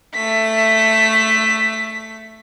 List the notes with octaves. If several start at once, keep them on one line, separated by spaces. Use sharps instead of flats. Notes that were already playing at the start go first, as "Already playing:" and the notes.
A3 B6